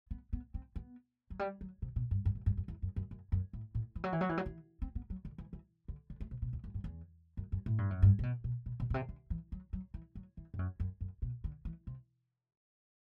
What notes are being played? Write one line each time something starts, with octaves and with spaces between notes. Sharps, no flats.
B3
B3
C4
B3
F#3
G3
F#3
C3
B2
G2
G2
F#2
G2
F#2
E2
F#2
F#2
F#2
F#2
A2
A2
E3
F#3
E3
F#3
E3
F#3
E3
C4
B3
F#3
D3
E3
E3
D3
D3
A3
C3
B2
E2
F#2
G2
E2
F#2
F#2
A2
G2
F#2
G2
C3
B2
B2
B2
B2
B2
C3
D3
E3
F#3
F#3
E3
F#3
E3
G2
F#2
F#2
F#2
B2
D3
E3
C3